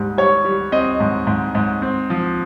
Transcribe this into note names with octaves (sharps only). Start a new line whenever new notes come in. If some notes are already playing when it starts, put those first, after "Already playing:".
Already playing: G#2 G3
G3 C#5
G3
C4 D#5
G#2
G#2
G#2
C4
F3